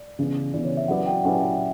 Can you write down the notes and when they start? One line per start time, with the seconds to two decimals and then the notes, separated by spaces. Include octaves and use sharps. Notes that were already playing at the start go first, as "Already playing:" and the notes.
Already playing: D5
0.19 C#3 E3 B3
0.54 C#3 E3 B3 D5
0.65 C#5
0.77 E5
0.88 F#3 C#4 E4 B4 D5 F#5
1.06 G5
1.23 F#3 C#4 E4 B4 D5 F#5
1.41 E5